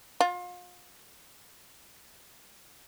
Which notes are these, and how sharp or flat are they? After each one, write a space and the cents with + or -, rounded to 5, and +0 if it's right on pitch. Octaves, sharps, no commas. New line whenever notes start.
F4 +35